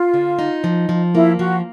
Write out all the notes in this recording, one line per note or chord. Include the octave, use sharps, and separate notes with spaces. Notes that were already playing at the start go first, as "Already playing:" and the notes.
Already playing: F4
D3
D#4
F3
F3
A#3 E4
F3 F#4